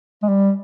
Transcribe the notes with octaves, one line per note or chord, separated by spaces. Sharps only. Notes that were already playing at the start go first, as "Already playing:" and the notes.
G#3
G3